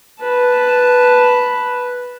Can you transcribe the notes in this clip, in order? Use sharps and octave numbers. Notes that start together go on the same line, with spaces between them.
B4 A5